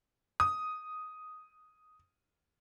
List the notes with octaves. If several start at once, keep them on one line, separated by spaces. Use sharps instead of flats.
D#6